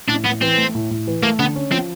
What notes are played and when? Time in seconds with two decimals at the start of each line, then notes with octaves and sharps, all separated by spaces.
0.09 A2 D4
0.25 A2 B3
0.42 E3 C4
0.57 A3
0.75 A2
0.91 A2
1.07 E3
1.23 A3 A#3
1.39 D3 B3
1.55 C#4
1.72 F3 C4